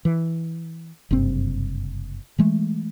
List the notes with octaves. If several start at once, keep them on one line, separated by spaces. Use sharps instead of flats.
E3
F#1 G2 C3 C4
E3 G#3 A3